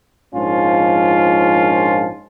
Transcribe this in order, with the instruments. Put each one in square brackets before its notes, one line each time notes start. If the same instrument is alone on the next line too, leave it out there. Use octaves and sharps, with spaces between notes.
[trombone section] A#1 G#2 F3 C#4 F4